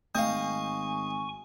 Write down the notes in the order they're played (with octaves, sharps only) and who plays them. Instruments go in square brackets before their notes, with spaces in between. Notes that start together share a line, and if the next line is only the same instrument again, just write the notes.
[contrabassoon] G#1 [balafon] A3 [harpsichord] D#5 F5 [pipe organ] G#5 C#6